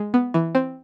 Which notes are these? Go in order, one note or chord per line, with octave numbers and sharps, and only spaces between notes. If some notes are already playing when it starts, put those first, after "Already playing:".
Already playing: G#3
B3
E3
C4